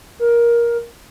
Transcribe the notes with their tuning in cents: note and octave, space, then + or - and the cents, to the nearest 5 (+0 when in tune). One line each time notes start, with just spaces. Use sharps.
A#4 +15